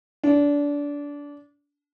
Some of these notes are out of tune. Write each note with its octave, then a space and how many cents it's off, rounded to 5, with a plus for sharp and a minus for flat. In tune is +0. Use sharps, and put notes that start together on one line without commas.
D4 -25